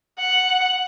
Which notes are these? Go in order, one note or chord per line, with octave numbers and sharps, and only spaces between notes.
F#5